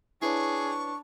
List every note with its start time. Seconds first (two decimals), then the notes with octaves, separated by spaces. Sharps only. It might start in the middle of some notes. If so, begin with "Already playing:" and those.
0.22 D4 E4 G#4 B4 C#5 C#6